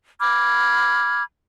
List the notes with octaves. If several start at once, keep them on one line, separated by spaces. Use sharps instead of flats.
B5 D6 F6 G#6